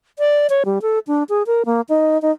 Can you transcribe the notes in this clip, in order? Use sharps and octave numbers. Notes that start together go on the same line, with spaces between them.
D5
C#5
G3
A4
D4
G#4
A#4
A#3
D#4
D#4